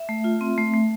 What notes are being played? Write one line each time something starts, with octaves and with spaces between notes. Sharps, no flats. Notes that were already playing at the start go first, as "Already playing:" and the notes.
Already playing: E5
A3
F4
C4
A3
A3